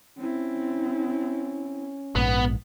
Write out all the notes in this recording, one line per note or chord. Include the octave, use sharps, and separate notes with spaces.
C4 C#4 E4
A#1 G#2 B3